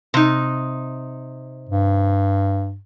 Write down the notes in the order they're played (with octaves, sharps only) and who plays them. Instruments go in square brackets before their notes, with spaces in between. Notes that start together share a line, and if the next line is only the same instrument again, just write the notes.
[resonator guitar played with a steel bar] C3 D#4
[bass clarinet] G2